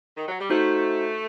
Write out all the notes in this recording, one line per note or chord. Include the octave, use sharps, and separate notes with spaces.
D#3
F#3
G3
A3 D#4 F#4 C5